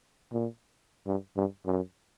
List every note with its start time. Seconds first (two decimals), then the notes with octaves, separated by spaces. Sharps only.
0.32 A#2
1.07 G2
1.36 G2
1.66 F#2